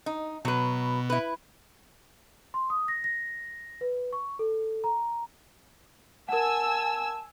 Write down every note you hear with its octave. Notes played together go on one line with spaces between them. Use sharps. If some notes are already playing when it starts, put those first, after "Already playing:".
D#4
B2 F#3 B4
E4 B4
C6
D#6
A#6
A#6
B4
C#6
A4
A#5
A#4 F#5 G#5 A5 E6